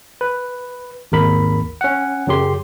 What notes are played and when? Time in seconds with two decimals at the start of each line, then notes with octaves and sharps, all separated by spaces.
0.21 B4
1.12 G#1 D#2 A#4 B5
1.81 C#4 F#5
2.27 F#2 C#3 F#3 G4 C6